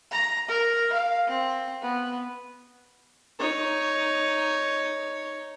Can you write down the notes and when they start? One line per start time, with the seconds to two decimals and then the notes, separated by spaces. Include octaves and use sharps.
0.11 A#5
0.48 A#4
0.93 F5
1.28 C4
1.82 B3
3.39 D#4 C#5